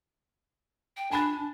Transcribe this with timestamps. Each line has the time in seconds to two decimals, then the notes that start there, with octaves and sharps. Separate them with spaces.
0.97 G5
1.11 D4 G#5 B5 A6